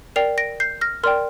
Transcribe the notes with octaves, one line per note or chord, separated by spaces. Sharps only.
A#4 D5 G5 C7 F7
A#6 D7
G6 C7
F6 A#6
A#4 D5 G5 C6 F6